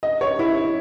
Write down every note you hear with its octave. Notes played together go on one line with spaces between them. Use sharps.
D#5
C#5
E4